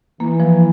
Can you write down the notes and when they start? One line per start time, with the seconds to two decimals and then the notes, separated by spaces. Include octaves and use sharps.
0.20 E3 A#3
0.40 F3